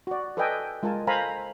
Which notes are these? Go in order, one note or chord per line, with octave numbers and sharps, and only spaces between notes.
F#4 D5
A4 B4 D5 D#5 G5 G#5
G#3 F4 A#4 G#5 A5
A4 C5 F5 G#5 A#5 B5